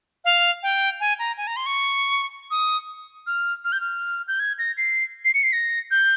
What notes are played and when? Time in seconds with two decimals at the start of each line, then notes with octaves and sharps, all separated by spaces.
0.25 F5
0.63 G5
1.00 G#5
1.19 A#5
1.38 G#5
1.47 A#5
1.56 C6
1.66 C#6
2.51 D#6
3.27 F6
3.65 F6
3.72 G6
3.81 F6
4.28 G6
4.40 G#6
4.59 A#6
4.77 C7
5.25 C7
5.34 C#7
5.43 C7
5.53 A#6
5.91 G6